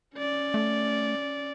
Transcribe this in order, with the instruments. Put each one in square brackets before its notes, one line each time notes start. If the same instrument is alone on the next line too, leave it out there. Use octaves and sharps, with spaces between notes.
[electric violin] C#4 D5
[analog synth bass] A3